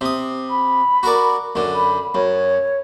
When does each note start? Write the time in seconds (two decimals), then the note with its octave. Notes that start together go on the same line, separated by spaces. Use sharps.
0.01 C3 D#6
0.50 B5
1.03 F#4 A#4 D5
1.55 F#2 D3
1.75 B5
2.15 F#2 C#5